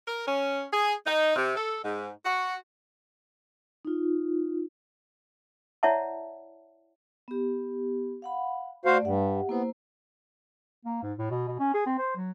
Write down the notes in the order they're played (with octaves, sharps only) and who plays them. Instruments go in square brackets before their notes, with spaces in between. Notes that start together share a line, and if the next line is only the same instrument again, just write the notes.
[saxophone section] A#4
C#4
G#4
D#4
C3
A4
G#2
F#4
[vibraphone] D#4 F4
[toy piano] E4 C#5 D5 E5 F#5 A5
[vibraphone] B3 G4
F5 F#5 B5
[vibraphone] A3 D5 [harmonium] F#4 C5 F5
[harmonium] G2 [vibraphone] G4 E5 F#5
[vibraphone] A#3 E4 C5 [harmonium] B3
[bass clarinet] A#3
G#2
A2
B2
B2
C#4
G#4
C4
C5
F#3